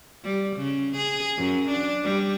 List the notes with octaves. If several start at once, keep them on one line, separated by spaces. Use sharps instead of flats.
G3
C#3
G#4
F#2
D4
G3